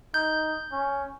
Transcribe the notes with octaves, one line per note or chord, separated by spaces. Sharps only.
D#4 G6
C#4